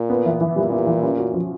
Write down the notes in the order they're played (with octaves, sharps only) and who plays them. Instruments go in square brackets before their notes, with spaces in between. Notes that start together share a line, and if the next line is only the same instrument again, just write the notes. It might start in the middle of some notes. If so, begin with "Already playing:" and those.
Already playing: [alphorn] A#2
[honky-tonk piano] B3
E3
E3
[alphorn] A#2 [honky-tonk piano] G3
[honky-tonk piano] B3
E3
C#4
F#4
F3